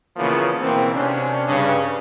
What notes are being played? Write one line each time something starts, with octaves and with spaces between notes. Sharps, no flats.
A#2 C#3 E3 F3 A#3 B3
B2 E3 A#3 C4
C3 C#4 D4
G2 C#3